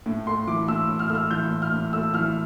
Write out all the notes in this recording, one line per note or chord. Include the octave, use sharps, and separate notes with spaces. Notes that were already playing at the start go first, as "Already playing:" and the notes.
A2
A3 C6
E3 D6
A2 E6
A2
F6
A3 E6
F6
E3 G6
A2
F6
A2
A3 E6
E3 F6